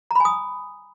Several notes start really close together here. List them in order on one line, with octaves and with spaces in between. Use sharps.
A#5 B5 G#5 D#6